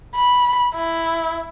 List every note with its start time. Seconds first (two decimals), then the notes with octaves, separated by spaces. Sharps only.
0.16 B5
0.75 E4